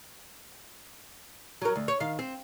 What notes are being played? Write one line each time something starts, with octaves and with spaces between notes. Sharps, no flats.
F#3 A#4
D2
C#5
D#3 F5
C4